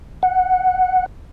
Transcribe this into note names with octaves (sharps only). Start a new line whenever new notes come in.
F#5